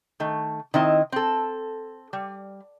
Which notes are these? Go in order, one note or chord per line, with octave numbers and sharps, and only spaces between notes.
D#3 A3
D#3 C4 E4 D#5
C4 A4
G3